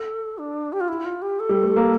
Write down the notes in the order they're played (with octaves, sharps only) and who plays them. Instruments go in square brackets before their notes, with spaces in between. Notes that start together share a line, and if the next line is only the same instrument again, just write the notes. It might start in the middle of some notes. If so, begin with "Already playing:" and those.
Already playing: [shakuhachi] A4
D4
G4
F4
E4
F4
G4
A4
[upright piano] G3
A3
A#3